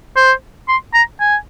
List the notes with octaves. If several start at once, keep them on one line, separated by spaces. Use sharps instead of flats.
C5
C6
A#5
G#5